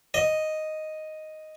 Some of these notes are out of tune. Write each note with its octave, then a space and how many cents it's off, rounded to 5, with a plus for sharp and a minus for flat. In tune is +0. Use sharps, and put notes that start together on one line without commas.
D#5 +0